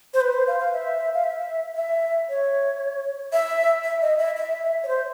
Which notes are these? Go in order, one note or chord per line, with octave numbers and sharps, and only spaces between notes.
C5
B4
C5
F5
F5
E5
F5
E5
E5
C#5
E5
E5
D#5
E5
E5
C#5
C5